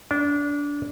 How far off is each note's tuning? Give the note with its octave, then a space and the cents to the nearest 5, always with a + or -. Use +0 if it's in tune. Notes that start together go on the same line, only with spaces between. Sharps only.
D4 -20